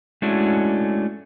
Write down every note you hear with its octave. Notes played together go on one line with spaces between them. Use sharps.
G#3 A3 C#4 D4 E4 F#4